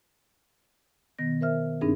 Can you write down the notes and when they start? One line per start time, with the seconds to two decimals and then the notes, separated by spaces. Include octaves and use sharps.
1.19 B2 D#3 B3 A#6
1.41 A#4 C5 E5 F6
1.81 G2 C4 D4 D#4 G#4